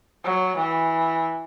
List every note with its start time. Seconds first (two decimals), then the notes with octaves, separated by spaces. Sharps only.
0.24 F#3
0.57 E3